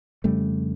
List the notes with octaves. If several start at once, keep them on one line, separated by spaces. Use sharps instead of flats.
F2 C#3 G3 A3